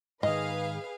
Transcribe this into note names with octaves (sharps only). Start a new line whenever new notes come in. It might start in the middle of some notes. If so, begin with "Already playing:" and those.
G#2 D#3 G#4 B4 D#5 F5